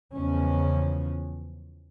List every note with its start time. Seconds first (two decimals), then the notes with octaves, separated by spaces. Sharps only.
0.14 E2 C#3 F3 G#3 C#4